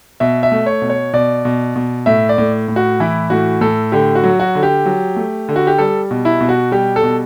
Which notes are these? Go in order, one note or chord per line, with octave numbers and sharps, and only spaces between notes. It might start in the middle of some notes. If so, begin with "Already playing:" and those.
B2 E5
E5
A3
C#5
B2
C#5
B2 D5
B2
B2
A2 E5
D5
A2
A2
F#4
E3 E4
A2 F#4
A2 A4
D3 G4
F#4
F#3
F#4
D3
G4
F#3
A3
D3
F#4
G4
G3 A4
B2
E4
B2
F#4
G3 G4
A4
B2